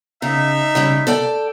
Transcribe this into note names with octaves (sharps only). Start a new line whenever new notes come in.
C#3 D#4 E5
C#3 G3 C#4
A4 D5 G5